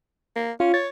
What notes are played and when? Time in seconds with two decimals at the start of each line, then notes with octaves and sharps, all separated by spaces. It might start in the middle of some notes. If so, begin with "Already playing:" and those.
0.36 A#3
0.60 C#4 F4
0.74 C#5 A6